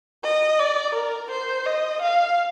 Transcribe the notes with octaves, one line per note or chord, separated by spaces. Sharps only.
D#5
D5
A#4
C5
D#5
F5